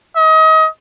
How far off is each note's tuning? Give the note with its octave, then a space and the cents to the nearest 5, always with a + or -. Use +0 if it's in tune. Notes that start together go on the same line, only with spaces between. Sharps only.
D#5 +30